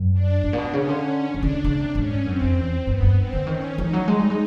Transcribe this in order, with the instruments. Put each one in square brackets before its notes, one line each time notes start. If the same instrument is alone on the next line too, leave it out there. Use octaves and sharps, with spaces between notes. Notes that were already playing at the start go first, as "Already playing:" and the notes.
Already playing: [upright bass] F#2
[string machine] D4
[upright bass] G2
A#2
B2
[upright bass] C#3 [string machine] C#4
[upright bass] D3
[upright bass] C3 [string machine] D4
[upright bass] D3
C#3
C#3
C3
[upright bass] G#2 [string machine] C#4
[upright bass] G2
[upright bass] F#2 [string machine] C4
[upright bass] F2
E2
[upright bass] G2 [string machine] B3
[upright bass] G2
[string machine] C4
[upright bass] D3
[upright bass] D#3 [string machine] C#4
[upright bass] E3 [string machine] D#4
[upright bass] F#3
[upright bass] G#3 [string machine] D#4
[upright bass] G3
G#3